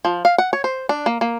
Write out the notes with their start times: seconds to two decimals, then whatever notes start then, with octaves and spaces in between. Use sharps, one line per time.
0.05 F3
0.25 F5
0.38 F#5
0.53 C#5
0.64 C5
0.89 D4
1.06 A#3
1.21 A#3